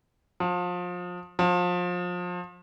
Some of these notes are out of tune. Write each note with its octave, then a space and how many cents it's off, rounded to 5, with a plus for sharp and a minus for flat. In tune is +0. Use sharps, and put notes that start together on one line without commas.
F3 +30
F3 +30